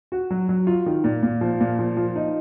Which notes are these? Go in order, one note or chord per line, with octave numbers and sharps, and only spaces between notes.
F#4
F#3
F#3
F4
D#3
A#2
A#2
F3
A#2
F3
F3
D#4